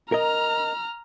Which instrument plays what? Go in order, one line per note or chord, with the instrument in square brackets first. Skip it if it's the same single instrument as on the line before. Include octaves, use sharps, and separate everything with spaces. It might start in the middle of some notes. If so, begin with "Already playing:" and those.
[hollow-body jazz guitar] A#4 D#5 [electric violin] A#5 F6